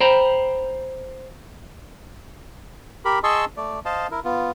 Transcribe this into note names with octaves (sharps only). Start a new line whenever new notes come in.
C5 G5 A#5 B5
G4 A#4 B5
G#4 D#5 A5 C6 C#6 E6
A3 D5
C5 D#5 F5 A5
E4 A#4
B3 F4